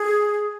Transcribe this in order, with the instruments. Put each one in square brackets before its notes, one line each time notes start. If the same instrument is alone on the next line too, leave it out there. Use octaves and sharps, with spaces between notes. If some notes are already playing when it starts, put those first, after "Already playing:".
Already playing: [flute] G#4